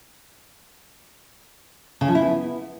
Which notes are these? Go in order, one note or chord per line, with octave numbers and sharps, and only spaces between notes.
C#3
F3
E4
B3